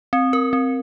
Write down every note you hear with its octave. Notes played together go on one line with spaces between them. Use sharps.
C4
A#4
C4